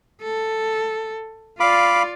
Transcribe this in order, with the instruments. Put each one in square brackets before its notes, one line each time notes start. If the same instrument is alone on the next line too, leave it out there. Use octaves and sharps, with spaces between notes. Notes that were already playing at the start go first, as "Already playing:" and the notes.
[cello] A4
[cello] F4 D5 [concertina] F5 B5 D6